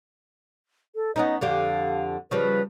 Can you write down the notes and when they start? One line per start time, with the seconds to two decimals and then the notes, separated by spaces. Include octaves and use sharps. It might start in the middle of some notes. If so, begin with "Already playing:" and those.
0.95 A4
1.16 B3 C#4 D#4 D#5
1.41 F2 D3 G4 F5
2.31 C#3 F3 G3 B4